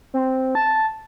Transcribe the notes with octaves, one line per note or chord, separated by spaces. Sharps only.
C4
A5